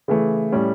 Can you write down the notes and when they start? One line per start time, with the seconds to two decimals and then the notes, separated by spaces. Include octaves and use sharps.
0.08 C#3 E3 A3
0.52 A2 G3 C#4